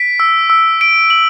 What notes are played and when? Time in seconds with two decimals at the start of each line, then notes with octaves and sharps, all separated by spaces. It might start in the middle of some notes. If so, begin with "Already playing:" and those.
Already playing: B6 D7
0.20 E6
0.50 E6
0.81 D7
1.10 F#7